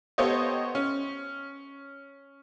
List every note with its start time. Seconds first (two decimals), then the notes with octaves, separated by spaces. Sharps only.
0.18 B3 G4 A4 C5 C#5 D#5
0.75 C#4